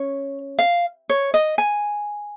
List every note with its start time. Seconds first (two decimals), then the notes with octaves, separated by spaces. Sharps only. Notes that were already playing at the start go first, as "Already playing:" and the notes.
Already playing: C#4 C#5
0.59 F5
1.09 C#5
1.34 D#5
1.58 G#5